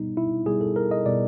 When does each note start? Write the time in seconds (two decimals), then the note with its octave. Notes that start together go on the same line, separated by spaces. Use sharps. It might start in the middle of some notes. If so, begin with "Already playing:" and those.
Already playing: B2 G3 B3 D#4
0.17 E4
0.46 B2 G3 B3 G#4
0.61 A4
0.76 A#4
0.91 D#5
1.06 B2 G3 B3 D5